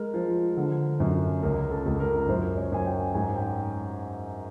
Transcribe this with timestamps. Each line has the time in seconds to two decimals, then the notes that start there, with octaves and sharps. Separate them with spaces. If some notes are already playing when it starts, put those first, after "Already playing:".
Already playing: G#3 A#4
0.14 F3
0.57 D3
1.00 F#2
1.43 C#2 A#4
1.71 A4
1.86 C#2
2.00 A#4
2.28 F#2 C5
2.57 C#5
2.72 F#2 G#5
2.86 G5
3.14 G#2 G#5
3.36 G5